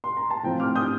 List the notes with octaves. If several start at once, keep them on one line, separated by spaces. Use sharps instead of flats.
C6
A#5
A5
A2 F3 C4 F4 G5
D6 F6
D#6 G6